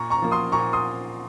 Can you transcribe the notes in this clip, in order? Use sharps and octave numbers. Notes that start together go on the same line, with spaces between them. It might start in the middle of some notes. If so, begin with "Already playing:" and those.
Already playing: A#2 A#5 C#6
A#5 C#6
F3 A#3
C6 D#6
A#2 A#5 C#6
C6 D#6